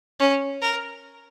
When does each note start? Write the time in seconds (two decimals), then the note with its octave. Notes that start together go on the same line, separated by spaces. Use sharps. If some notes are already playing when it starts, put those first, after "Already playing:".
0.20 C#4
0.61 A#4